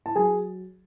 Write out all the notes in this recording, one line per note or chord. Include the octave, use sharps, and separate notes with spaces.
A5
F#3 G#4 G#5